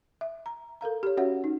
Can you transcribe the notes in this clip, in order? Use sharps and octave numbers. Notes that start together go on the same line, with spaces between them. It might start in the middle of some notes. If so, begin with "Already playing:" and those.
E5
A#5
A4 A#4 F5 A#5
G4 C#5
C#4 F#4 C#5 E5 F#5
D#4